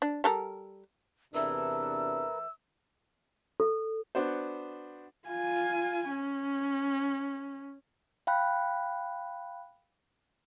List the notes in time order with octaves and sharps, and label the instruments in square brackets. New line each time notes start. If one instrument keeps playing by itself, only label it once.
[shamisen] D4
G3 A4 A#4
[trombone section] E2 C3 D4 [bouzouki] E3 A3 [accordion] A#4 B4 [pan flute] E6
[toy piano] A4
[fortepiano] B3 D4 F#4 C5
[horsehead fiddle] F4 G#5
C#4
[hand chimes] F5 G5 B5 F#6